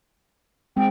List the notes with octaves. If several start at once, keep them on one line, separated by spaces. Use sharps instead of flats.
G#3 C4 G5